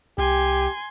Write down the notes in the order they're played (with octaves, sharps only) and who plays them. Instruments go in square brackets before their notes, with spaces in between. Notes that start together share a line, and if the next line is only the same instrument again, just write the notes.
[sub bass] C2 [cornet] G4 [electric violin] G#5 C6